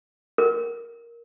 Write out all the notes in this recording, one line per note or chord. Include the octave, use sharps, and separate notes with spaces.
A#4